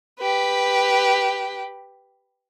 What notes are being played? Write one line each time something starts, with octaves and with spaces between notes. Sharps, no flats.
G4 B4